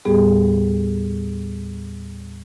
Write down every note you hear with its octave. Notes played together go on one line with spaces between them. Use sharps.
D#2 A2 G3 B3 G4 G#4